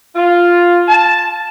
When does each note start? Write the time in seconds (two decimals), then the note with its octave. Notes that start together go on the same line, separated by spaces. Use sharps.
0.15 F4
0.88 A5